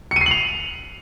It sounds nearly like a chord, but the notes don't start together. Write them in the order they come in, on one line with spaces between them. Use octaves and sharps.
C#7 D#7 C7 F#7 F7